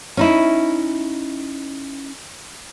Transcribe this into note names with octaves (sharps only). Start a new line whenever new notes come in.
C#4 D#4 E4